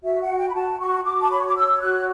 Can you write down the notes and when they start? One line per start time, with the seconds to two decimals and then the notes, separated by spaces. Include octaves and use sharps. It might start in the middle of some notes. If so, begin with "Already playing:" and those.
0.03 F#4 E5
0.21 F#5
0.29 F#4
0.37 G5
0.49 B5
0.54 F#4 A5
0.80 F#4 C#6
1.04 F#4 D6
1.22 A5
1.30 C#5 B5
1.38 C#6
1.47 D6
1.55 C#5 E6
1.81 F#4 F#6